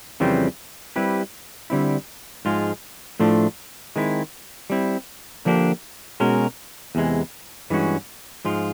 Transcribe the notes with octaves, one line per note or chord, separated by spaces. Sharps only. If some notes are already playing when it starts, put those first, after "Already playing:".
F2 C#3 E3 G3 C4
G3 C4 E4 G4 B4
D3 G3 C4 E4
G#2 F3 G#3 F4
A2 F3 A3 D4 F4
D#3 G#3 C4 E4
G3 C4 E4
D3 F3 A#3 D4 G4
B2 G#3 C#4 F#4 A#4
E2 C3 E3 G#3
G2 E3 G#3 C#4 F#4
G#2 F3 G#3 F4